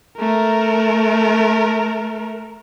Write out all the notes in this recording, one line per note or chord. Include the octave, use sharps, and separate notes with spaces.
A3 A#4